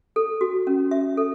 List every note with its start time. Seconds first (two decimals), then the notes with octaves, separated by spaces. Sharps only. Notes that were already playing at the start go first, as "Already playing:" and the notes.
0.16 A4
0.41 F#4
0.67 C#4
0.91 E5
1.17 A4